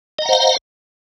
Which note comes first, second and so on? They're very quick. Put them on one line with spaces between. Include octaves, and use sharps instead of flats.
D#5 A#5 F#5 C5 F5